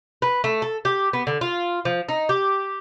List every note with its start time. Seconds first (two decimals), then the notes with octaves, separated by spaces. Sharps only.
0.22 B4
0.44 A3
0.62 A4
0.85 G4
1.13 B3
1.27 D3
1.41 F4
1.85 F3
2.09 D#4
2.29 G4